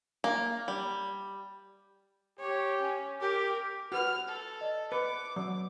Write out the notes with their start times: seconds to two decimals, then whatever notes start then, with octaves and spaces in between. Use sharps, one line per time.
0.24 A#3
0.68 G3
2.40 G4 C#5
2.81 C#4
3.21 G4 A#4 D6
3.92 F#4 B4 F6
4.28 A4
4.61 D5 D#5
4.92 B4 D6 C#7
5.36 F#3 D5